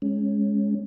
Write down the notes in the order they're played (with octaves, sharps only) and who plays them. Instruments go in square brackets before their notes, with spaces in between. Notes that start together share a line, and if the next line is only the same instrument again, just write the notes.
[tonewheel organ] G#3 C#4